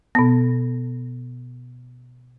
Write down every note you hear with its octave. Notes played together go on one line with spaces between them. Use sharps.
B2 B3